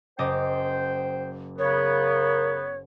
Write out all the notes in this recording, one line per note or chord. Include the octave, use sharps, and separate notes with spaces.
F#1 C5 D#5 G5 D6
C#3 B3 A#4 C#5